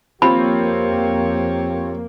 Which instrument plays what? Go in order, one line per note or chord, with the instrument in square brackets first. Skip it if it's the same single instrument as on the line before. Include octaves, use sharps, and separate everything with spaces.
[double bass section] F2 A#3 [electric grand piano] C4 F4 [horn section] G4 C#5 [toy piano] B5